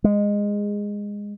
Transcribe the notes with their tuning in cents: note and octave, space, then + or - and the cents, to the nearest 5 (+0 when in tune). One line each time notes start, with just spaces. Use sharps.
G#3 -15